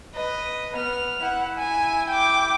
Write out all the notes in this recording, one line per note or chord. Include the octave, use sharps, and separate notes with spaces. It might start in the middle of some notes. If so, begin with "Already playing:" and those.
B4 D#5
B3 F6
E4 F#5
G#5
G5 D6